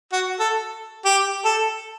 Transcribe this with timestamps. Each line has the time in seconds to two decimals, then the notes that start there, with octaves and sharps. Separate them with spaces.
0.12 F#4
0.40 A4
1.05 G4
1.45 A4